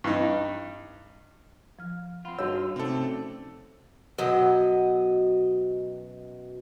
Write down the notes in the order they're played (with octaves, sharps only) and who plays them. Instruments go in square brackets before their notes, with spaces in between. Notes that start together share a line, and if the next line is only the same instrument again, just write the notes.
[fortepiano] G2 D#4
[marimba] F3 F6
[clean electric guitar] C4 F4 [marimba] F5 F#5 B5
[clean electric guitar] G2 D#4 F4 [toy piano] F#4 C#5 [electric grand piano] E6
[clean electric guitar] C3 A3 D5 [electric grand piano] C4 A4 [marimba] C#4 D#4
[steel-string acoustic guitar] F#2 B2 F#3 D#5